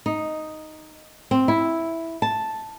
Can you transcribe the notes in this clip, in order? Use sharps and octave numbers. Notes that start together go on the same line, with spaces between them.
D#4
C4
E4
A5